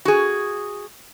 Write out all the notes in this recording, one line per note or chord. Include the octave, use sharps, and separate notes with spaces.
F#4 G#4